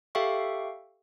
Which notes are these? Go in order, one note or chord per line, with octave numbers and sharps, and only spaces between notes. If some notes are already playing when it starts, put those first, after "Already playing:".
G4 A4 E5 F5 G5 C#6